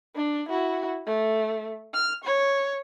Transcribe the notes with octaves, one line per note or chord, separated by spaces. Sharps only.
D4
E4 F#4
A3
F6
C#5